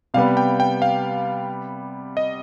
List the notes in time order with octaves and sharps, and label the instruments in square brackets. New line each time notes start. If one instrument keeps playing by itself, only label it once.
[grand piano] C3 G3 B3 [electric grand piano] F5
[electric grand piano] G5
G5
F5
D#5